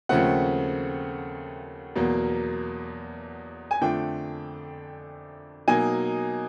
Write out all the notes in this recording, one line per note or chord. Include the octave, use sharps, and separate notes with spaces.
D#2 C#3 F3 A3 C4 F#5
E2 B2 F#3 A#3
G#5
F2 D3 F3 A3 D4 G5
B2 F#3 A#3 D#4 G#5